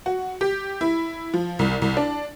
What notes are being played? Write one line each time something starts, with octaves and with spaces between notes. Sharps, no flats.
F#4
G4
E4
F3
C2
C2
D4